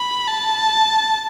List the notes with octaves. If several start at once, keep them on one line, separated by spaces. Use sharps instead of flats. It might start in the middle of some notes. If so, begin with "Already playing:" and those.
Already playing: B5
A5